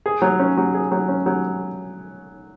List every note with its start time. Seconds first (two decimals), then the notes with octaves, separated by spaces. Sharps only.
0.06 G#4
0.22 F#3
0.39 C#4
0.57 F#3
0.74 G#4
0.91 F#3
1.08 C#4
1.26 F#3